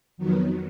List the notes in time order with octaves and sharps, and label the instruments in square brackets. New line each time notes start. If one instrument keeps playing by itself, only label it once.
[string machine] F2 D#3 F#3 B3